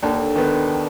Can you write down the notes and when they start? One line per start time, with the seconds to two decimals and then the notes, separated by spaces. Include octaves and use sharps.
0.02 D#2 D3
0.36 D#3 B3